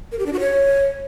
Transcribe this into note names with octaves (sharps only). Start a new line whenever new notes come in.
A#4
G4
D4
F#4
C#5